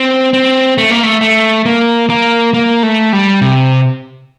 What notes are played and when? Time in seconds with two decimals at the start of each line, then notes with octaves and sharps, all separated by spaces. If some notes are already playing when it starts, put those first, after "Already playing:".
Already playing: C4
0.33 C4
0.78 A3
0.90 A#3
1.03 A3
1.21 A3
1.66 A#3
2.10 A#3
2.54 A#3
2.83 A3
3.13 G3
3.42 C3